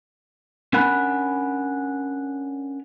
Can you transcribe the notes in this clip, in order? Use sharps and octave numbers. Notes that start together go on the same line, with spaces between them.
C#4 D4 A#4 F#5 G#5 B5